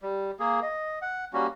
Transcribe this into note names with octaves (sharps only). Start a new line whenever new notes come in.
G3
A#3 G#4
D#5
F#5
G3 A#3 C#4 F#4